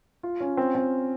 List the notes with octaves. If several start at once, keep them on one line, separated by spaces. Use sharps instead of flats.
F4
C#4
C4
C4